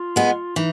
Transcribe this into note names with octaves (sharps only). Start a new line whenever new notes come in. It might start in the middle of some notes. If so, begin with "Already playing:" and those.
Already playing: F4
G#3 B3
E3 D#4